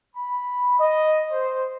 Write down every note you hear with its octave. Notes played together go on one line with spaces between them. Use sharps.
B5
D#5
C5